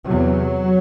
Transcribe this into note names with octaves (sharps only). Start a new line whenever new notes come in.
E2 C3 F#3